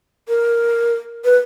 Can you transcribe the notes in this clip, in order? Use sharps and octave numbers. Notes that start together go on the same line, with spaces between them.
A#4
B4